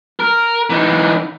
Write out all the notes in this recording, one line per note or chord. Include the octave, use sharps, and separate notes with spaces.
A#4
E3 D#4